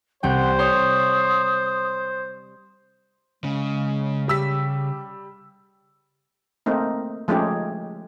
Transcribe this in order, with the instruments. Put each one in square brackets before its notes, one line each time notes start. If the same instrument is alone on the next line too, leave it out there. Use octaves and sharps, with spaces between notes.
[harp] C2 G3 G5 [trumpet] C5 [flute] F#5
[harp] C#5 C6 [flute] D#6
[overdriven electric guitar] C#3 [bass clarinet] G#3
[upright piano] G3 E6 B6 [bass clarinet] G4
[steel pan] A3 A#3 C4 D#4
F3 G#3 A3 C#4 D#4 G4